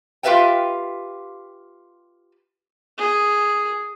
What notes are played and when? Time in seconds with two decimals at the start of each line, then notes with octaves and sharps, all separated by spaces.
0.23 F4 G4 B4 E5 F5 G5
2.98 G#4